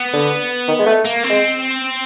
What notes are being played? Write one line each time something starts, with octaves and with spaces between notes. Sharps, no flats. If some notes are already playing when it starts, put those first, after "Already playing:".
Already playing: B3
D3
D#3
G#3
A3
A#3
C4
G#3